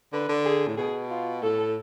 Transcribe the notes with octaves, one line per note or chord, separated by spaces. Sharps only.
D3 B4
D3
G#4
A2
B2 G#4
F4
A2 A4